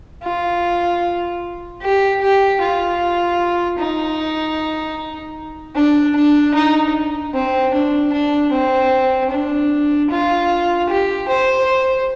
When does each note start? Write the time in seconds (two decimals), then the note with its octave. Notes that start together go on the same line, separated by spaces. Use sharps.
0.23 F4
1.81 G4
2.21 G4
2.60 F4
3.78 D#4
5.75 D4
6.15 D4
6.54 D#4
7.34 C4
7.73 D4
8.12 D4
8.52 C4
9.31 D4
10.10 F4
10.89 G4
11.28 C5